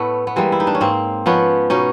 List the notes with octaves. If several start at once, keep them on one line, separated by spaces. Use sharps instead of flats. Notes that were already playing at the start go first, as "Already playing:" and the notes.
Already playing: A2 A3 B3
B3
E3 G3 G#3 A#3
E4
D#4
D4
C#4
G#2 A#3 C4
F3 B3 C#4
B2 C#4 D#4